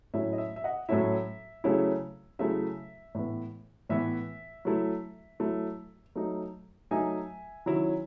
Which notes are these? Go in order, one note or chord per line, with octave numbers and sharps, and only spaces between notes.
A2 F#3 A3 C#4 E4 E5
D#5
E5
E5
D#5 F#5
A2 F#3 A3 C#4 E4 E5
C#3 F#3 A3 C#4 E4
C#3 F#3 A3 C#4 E4 E5
A2 E3 B3
A2 E3 B3 E5
F#3 A3 E4
F#3 A3 E4
F#3 A3 D#4
F#3 A3 D#4 E5 G#5
D#3 F#3 C#4 E4